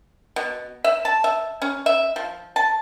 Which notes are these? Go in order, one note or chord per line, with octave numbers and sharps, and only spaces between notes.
B2
E5
A5
E5
C#4
E5
F3
A5